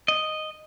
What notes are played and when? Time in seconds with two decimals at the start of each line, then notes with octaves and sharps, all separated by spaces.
0.08 D#5